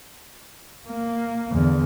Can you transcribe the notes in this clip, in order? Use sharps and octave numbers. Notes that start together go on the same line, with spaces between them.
A#3
E2 D3